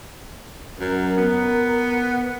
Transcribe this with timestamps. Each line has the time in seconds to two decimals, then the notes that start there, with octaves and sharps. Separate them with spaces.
0.79 F#2 A#4
1.17 B3